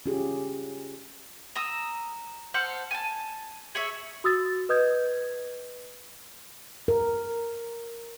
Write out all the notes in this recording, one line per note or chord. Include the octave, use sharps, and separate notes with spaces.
C#4 F4 G4 G#4
A#5 D#6 E6
A4 C5 F#5 F6
G#5 A5
G#4 C#5 E5
F#4 D#6 E6 A6
B4 D#5 D#6 G6 G#6
A#4